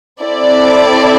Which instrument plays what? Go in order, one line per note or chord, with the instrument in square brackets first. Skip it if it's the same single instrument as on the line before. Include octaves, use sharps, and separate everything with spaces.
[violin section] C4 E4 A4 D5